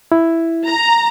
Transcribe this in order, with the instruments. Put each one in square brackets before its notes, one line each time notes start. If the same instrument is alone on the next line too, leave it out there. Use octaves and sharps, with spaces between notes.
[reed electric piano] E4
[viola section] A#5